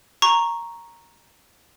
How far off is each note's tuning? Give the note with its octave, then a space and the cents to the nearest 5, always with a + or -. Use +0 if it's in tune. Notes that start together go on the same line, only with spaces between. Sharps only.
A#5 +0 C#6 -10